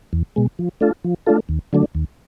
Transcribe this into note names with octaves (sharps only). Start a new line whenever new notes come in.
E2
B2 G#3
F3
A3 D4 F4 A4
F3
A3 D4 F4 A4
D#2
D3 F#3 A3 D4
D#2